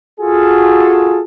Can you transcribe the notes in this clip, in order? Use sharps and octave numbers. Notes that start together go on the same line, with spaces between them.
F4 F#4 G#4 A4